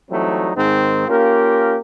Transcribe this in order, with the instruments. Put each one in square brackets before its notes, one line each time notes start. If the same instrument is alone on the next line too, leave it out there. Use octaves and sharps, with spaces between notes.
[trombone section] E3 F#3 G3 A3 C4 D#4
G#2 D#3 C4
A#3 C#4 F4 G4 A#4